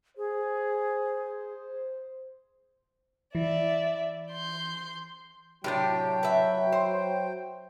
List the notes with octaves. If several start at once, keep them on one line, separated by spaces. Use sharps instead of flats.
G#4 C5
E3 D5 E5
C6 G6
A2 C3 F#3 D4 G4 G5
B4 E5
C5